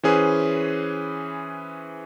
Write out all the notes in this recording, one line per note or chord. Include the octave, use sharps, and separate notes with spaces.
E3 C#4 G#4 B4 C5